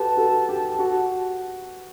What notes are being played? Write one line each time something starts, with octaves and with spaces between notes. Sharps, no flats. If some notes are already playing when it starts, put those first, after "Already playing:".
Already playing: F#4 G4 A4 B4 A5
F#4 A4
G4
F#4